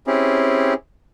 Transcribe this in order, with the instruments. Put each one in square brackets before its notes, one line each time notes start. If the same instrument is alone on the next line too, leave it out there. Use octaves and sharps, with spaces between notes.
[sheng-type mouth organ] C4 C#4 E4 G4 G#4